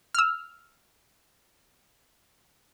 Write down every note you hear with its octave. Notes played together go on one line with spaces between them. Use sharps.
E6 F6